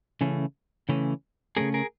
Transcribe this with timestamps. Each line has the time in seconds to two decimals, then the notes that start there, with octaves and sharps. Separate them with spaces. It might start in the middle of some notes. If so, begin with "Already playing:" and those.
0.21 C#3 E3 A3 C#4
0.89 C#3 E3 A3 C#4
1.57 C#3 E3 A3 C#4 G#4 A#4
1.74 G#4 A#4